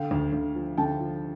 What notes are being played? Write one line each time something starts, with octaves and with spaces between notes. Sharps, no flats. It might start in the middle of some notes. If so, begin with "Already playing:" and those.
Already playing: D3 F5 G5
D2
D2
F3
D3 G5 A5
F3